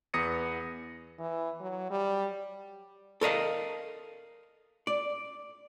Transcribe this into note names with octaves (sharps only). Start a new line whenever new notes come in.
E2 B3 D#6 A#6 C#7 D#7
E3
F#3
G3
A4 A#4 D#5 F5
D5